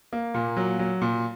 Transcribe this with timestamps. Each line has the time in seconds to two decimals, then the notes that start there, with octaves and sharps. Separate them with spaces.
0.13 A#3
0.34 A#2
0.57 F#3
0.79 F#3
1.01 A#2